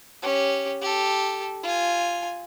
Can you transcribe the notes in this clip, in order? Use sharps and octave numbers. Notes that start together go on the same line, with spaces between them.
C#4 G4
G4 A4
F4 G#5